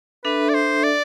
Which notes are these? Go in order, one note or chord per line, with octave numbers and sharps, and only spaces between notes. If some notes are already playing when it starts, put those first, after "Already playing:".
D4 A4 B4 E5
D5
C5
D5